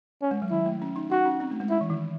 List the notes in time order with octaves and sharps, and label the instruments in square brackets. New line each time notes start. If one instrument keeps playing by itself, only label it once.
[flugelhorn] C#4
[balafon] G#3
F#3
[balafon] D#3 [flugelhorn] E4
[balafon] A3
C#4
D#4
[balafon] D#4 [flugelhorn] F#4
[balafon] C#4
C4
A3
G#3
[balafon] G#3 [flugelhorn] E4
[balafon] E3
D#3